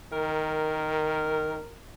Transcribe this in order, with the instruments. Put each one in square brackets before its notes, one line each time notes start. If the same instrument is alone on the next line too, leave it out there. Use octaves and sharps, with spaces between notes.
[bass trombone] D#3 [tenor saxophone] A#4